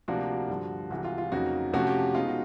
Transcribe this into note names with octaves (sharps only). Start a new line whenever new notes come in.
D2 C3 F3 A#3 D4 F#4
G2 D3 F3
C2 C3 E3 G#3 F#4
F4
F4
F2 C#3 F#3 A#3 D#4 F#4
C3 F3 A3 C#4 F#4
G4
B2 G#3 B3 D#4 F4
F#4